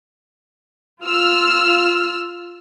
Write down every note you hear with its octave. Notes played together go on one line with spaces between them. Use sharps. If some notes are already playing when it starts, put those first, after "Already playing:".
F4 E6 F6